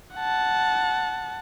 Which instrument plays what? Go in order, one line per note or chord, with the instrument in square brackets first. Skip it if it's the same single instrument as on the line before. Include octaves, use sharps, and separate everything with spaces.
[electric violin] F#5 A5